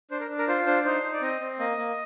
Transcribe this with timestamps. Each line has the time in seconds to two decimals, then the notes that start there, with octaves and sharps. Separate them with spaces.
0.11 D4 C5
0.20 A#4
0.29 D4
0.38 A#4
0.48 F4 C5
0.66 D4 C5
0.85 D#4 C5
1.03 D#4
1.13 D5
1.22 C4 D#5
1.41 C4
1.59 A#3 D#5
1.78 A#3